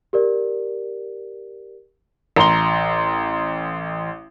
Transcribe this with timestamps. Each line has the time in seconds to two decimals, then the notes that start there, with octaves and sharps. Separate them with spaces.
0.13 G4 A#4 D5
2.36 A1 A#5 C6 G7